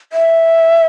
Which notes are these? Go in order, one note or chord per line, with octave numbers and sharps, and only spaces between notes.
E5